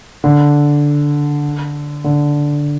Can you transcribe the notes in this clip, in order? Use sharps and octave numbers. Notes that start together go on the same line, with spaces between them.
D3
D3